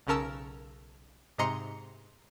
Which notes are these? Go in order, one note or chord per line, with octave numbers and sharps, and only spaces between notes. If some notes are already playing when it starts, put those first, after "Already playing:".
B1 C#3 C#4 A#4 A5 E6
G#2 C3 D#5 A#5 C6 C#7